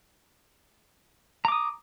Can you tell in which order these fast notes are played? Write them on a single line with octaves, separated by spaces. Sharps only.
A#5 D6 D#6